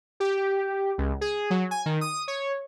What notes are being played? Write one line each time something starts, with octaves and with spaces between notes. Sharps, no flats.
G4
C#2
G#4
F#3
G#5
D#3
D#6
C#5